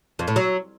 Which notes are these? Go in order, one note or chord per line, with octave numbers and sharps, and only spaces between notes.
F2
A2
F#3